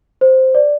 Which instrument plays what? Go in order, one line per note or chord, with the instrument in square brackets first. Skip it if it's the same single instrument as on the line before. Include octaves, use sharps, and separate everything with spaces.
[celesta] C5
D5